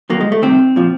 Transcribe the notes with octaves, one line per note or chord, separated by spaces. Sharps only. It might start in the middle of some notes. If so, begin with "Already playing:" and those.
D#2 D#3 F#3 A#3
G#3
A3
C2 C3 D#3 C4
A#2 F3